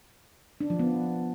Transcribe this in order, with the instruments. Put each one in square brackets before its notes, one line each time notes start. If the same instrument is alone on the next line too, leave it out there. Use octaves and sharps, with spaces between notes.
[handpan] D4
F3
B3